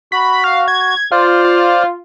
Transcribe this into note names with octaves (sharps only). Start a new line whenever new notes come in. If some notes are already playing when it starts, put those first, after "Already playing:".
F#4 B5
F5
G#6
F4 C5 D5 F6
F4